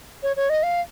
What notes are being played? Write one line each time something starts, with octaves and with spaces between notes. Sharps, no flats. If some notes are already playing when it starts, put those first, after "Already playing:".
C#5
C#5
D#5
F5